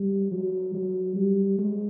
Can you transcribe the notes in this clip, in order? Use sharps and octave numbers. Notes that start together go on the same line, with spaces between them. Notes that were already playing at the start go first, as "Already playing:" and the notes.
Already playing: G3
F#3
F#3
G3
G#3